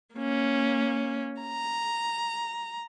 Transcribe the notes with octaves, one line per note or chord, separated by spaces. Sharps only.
A#3 C#4
A#5